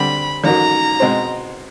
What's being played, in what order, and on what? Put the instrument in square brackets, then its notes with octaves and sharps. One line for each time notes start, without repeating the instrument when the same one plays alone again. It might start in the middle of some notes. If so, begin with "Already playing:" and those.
Already playing: [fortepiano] D2 D3 G3 C4 [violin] B5
[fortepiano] A1 G#2 D#3 F#3 [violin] A#5
[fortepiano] B2 G#3 C4